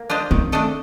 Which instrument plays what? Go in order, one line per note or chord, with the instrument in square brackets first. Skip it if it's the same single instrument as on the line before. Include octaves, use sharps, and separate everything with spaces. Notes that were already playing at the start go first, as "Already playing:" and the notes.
Already playing: [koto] A#3
D4 F4 C5 D#5
[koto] D#3 [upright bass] C4
[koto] A3 D4 A4 D#5